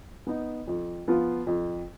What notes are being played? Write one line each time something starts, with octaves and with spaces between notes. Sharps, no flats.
B3 D#4
F2
F3 B3 F4
F2